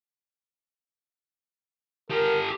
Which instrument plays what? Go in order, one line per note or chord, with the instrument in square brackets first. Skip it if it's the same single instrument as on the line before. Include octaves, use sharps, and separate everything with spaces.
[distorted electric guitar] G4 A4 [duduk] A#4